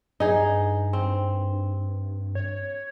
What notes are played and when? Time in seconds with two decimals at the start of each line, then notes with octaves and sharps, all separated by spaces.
0.20 G2 D#4 G#4
0.93 C4
2.35 C#5